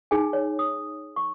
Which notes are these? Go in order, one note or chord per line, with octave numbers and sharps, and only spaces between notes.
D#4 G#4 G#5
C#5
D#6
C#6